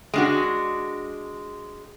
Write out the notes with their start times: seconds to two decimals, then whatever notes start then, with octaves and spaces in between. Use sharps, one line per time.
0.14 G#3 D4 F#4